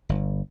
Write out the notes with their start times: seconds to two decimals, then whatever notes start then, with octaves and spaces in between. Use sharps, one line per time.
0.09 G1